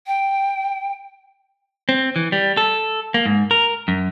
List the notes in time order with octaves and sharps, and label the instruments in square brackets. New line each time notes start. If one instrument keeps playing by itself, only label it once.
[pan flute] G5
[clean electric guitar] C4
E3
G3
A4
A#3
G#2
A#4
F#2